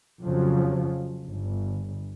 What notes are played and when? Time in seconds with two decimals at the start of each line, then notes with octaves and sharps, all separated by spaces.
0.22 F2 C#3 F3 F#3
1.23 G1